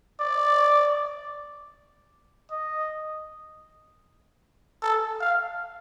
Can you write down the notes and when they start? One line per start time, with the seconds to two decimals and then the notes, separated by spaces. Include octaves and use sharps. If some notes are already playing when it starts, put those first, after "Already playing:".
0.20 D5
2.51 D#5
4.83 A4
5.20 F5